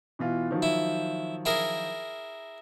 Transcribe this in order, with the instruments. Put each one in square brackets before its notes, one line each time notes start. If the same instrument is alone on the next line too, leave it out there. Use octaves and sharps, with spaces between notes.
[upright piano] B2 E3 F4
D#3 F3 F#3
[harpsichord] E4
E4 G#4 A#4